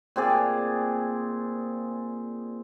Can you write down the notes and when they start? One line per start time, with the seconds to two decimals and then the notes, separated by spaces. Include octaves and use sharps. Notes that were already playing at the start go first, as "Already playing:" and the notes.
0.16 A#2 C4 G#4 D5